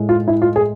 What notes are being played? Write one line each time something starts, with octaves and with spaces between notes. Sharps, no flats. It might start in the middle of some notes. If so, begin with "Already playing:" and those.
Already playing: A2 G#3
F4
E4
F4
G#4